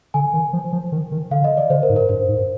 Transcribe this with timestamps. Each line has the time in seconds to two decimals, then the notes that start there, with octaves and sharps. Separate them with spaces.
0.14 D3 G#5
0.34 D#3
0.53 F3
0.73 F3
0.92 D#3
1.12 D#3
1.31 D3 F5
1.44 D#5
1.57 D5
1.70 D3 C5
1.83 A#4
1.90 G#2
1.96 A#4
2.09 G2 C5
2.29 G#2